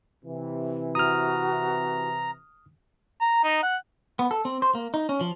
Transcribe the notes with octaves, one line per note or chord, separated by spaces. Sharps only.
C3 E3
F#4 A#5 D#6 F6
A#5
D#4
F#5
B3
A4
C4
C5
A#3
D#4
C#4
F3